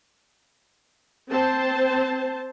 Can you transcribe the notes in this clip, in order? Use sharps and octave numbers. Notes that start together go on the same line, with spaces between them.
C4 C5 A5